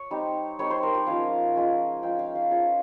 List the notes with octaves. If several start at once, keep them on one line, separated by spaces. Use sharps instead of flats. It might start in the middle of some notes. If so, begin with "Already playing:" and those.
Already playing: C#5
G3 C4 D#4
G3 C4 D#4 C#5
C5
A#4
G4
F3 G#3 C#4 F5
F3 G#3 C#4
F3 G#3 C#4 G5
F5
F5
F3 G#3 C#4 C#5